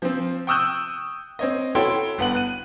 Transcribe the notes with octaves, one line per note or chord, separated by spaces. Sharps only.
F3 C4
G5 C#6 D#6 E6 F#6 G6
C4 C#5 D#5
E4 F#4 A4 C#5 G5 C6
G1 B3 F#5 F#7
F#6 D#7